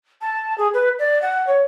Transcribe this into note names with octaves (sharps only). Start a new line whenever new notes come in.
A5
G#4
B4
D5
F#5
C#5